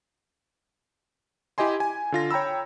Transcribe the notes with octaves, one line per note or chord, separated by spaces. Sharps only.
E4 G4 D#5 G#5 C6
G#5
D3 F4 A#6
C#5 G5 A#5 B5 E6